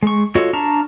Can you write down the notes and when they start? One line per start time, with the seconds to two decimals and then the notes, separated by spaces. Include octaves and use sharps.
0.03 G#3 C#6
0.35 F4 F#4 A4 C#5 D#5
0.53 D4 A5 A#5 C#6 F6